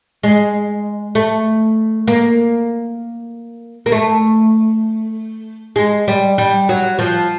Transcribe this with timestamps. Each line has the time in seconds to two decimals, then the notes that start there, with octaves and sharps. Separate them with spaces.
0.23 G#3
1.15 A3
2.07 A#3
3.86 A#3
3.92 A3
5.76 G#3
6.08 G3
6.38 G3
6.69 F#3
6.99 F3